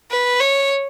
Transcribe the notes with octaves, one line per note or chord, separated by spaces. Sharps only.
B4
C#5